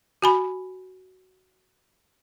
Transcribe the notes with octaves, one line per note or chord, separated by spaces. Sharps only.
F#4 G#5 B5